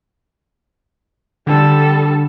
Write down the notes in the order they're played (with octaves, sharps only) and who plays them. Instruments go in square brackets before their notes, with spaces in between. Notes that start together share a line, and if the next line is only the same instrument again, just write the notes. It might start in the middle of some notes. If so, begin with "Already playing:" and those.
[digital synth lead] D3 [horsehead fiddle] G3 A4